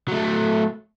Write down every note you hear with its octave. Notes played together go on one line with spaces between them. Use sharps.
F#3 A3